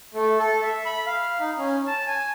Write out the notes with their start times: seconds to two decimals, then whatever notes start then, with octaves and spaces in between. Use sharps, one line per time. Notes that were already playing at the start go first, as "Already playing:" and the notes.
0.14 A3
0.39 A4
0.62 E5
0.85 B5
1.06 F5
1.40 D#4
1.58 C#4
1.87 A5
2.07 G#5